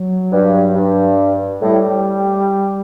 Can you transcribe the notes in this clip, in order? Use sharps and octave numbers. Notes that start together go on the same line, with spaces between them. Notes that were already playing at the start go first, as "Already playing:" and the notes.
Already playing: F#3
G2
G2
A2 G3